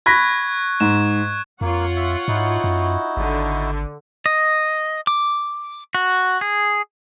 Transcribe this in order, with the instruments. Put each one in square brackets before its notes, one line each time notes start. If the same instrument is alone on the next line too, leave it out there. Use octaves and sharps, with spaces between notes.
[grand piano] B5 A#6 B6 [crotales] C#6 F#6 G#6
[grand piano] G#2 [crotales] E7
[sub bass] F2 [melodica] A#3 [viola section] F4 C#5 F#5
[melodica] E5
[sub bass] G#2 [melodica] D#4 E4 F#4
[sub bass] F#2
[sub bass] G#1 [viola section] D3
[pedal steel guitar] D#5
D6
F#4
G#4